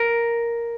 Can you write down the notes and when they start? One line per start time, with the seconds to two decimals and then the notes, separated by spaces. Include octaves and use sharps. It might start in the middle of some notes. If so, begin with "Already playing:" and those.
Already playing: A#4